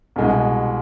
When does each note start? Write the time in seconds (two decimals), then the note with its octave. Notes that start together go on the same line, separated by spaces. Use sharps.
0.16 C2 B2 G#3